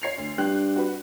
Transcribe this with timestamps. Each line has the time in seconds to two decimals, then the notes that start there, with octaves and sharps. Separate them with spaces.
0.02 C#5 C7 F7
0.18 D2
0.38 G2 G5 F#6
0.76 F#4 B4